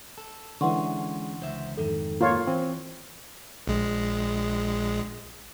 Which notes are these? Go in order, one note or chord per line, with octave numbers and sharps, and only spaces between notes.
A4
D3 E3 G#3 C#4 F#5 C6 C#6
C#2 C5 E5
F2 G#2 D#3 A4
A#3 F4 C#5
E3 C4 C#6
A#1 G#3